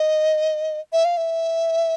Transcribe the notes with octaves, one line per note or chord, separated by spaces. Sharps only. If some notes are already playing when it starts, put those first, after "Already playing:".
Already playing: D#5
E5
F5
E5